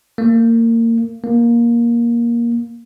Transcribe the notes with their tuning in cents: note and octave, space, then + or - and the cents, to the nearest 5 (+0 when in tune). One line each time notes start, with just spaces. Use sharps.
A#3 -25
A#3 +15